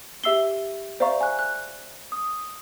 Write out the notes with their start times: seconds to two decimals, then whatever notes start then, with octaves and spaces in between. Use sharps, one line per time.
0.24 G4 E5 E6 C7 G7
1.00 C5 D5 E5 F5 A#5 C#6
1.21 G#5 F#6
1.39 F#6
2.12 D#6